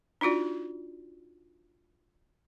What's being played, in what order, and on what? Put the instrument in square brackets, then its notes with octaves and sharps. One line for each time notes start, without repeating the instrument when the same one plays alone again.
[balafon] D4 D#4 F4 F#4 D5